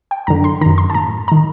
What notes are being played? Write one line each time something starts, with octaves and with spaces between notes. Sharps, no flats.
G5
F#2 D3 A#5
C6
F#2 D#3 A#5
C6
A5
A2 A#5
D#3 A#5